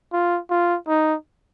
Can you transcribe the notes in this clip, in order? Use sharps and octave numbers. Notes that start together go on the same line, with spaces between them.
F4
F4
D#4